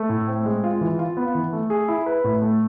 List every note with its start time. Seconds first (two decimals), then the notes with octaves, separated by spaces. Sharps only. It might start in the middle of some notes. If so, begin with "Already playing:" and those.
Already playing: A3
0.09 A2
0.28 C4
0.46 G#3
0.64 F4
0.81 E3
0.99 F4
1.17 B3
1.35 E3
1.53 A3
1.70 G#4
1.88 E4
2.06 B4
2.24 A2
2.42 A3